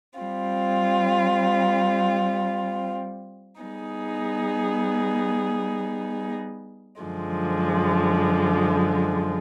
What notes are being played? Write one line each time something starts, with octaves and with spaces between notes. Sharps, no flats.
G3 C4 F4
G3 B3 D#4 G#4
F#2 D3 F3 G#3